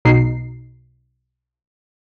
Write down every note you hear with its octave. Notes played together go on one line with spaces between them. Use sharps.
B1 B2 D#4 C7